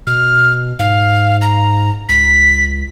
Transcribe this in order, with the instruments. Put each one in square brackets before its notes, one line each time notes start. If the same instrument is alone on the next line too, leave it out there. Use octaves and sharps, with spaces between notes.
[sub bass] B2 [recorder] F6
[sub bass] G#2 [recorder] F5
[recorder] A#5
[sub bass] C#2 [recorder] B6